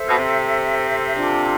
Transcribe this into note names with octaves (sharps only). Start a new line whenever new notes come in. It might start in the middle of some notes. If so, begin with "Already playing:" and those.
Already playing: A4 C5 E5
B2
C3
D4 F4 A4